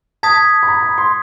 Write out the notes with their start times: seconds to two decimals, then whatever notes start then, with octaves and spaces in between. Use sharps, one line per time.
0.23 A5 D#6 G#6 B6
0.63 B5
0.68 A#5
0.83 B5
0.98 C6